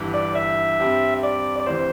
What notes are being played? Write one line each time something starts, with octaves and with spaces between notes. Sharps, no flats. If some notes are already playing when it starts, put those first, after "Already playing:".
Already playing: G1 G2 E3
D5
E5
G2 G3 C4
D5
D5
D2 C3 E3 C5